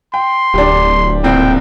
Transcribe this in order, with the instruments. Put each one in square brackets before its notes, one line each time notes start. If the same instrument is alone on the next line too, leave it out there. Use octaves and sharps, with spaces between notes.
[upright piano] G5 [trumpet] C6
[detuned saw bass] D1 [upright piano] D4 G4
[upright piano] C2 A#2 C4 [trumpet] G5